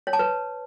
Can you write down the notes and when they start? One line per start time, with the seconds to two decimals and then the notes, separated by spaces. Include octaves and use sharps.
0.07 C#5
0.13 A5
0.19 B4